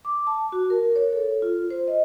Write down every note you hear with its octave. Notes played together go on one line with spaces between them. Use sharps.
D6
A5
F#4
A#4
C#5
A4
F4
C5
D#5